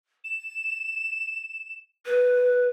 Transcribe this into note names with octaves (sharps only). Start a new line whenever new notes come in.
E7
B4